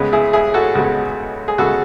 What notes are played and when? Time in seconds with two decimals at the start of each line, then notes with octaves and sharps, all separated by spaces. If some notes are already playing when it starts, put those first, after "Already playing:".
Already playing: C#2 C#3 G#3 B3
0.12 E4 G#4
0.33 E4 G#4
0.54 F#4 A4
0.75 C#2 C#3 G#3 B3 F#4
1.48 G#4
1.58 C#2 C#3 G#3 B3 F#4 A4